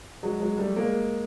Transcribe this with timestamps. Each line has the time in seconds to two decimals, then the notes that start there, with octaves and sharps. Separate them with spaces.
0.22 F#3 G#3
0.40 F#3 G#3
0.58 G3 A3
0.76 G#3 A#3